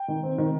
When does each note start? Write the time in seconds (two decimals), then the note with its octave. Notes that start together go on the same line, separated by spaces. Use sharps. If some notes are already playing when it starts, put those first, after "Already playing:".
Already playing: G5
0.08 D#3
0.23 C4
0.38 D#3